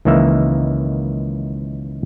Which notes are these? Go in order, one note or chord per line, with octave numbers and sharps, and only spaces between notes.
C#2 D#3 E3 A#3 E5